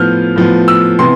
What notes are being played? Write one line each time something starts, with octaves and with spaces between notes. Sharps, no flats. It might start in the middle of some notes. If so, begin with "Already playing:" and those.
Already playing: A2 F3 B3 F6 G6
A2 F3 B3
E6
C3 E3 B3 C6